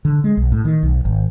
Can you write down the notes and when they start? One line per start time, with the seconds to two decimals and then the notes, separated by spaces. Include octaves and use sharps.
0.05 D3
0.24 G#3
0.37 B1
0.52 A2
0.65 D#3
0.83 B1
1.05 G#1